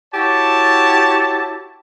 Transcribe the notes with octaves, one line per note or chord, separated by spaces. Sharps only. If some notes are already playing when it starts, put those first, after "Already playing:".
E4 F#4 G4 C#5 A5